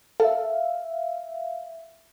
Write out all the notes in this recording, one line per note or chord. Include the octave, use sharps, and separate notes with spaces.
A4 E5 F5